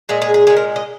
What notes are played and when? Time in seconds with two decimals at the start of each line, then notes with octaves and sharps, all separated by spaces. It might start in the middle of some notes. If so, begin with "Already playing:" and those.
0.09 A#2 G#3 G#4
0.22 G#4
0.34 G#4
0.47 A#2 G#3 G#4
0.57 A#4
0.76 D#5